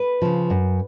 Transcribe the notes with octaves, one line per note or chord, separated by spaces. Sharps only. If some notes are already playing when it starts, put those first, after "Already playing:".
Already playing: B4
C#3 F3
F#2